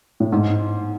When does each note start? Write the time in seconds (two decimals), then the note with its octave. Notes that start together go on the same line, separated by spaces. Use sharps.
0.20 A2
0.32 G#2